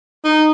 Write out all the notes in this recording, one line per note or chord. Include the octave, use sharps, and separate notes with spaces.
D#4